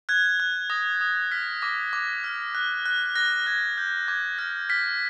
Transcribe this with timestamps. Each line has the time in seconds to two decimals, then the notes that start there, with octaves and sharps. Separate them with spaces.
0.09 F#6 G#6
0.40 F#6
0.70 D#6 A#6
1.01 D#6
1.31 F6 B6
1.62 D6 A#6
1.93 D6
2.24 F6
2.55 F#6
2.86 F#6
3.16 F#6 A#6
3.46 F#6 G#6
3.77 F6 G6
4.08 D6 G#6
4.39 F6 A#6
4.69 F6 B6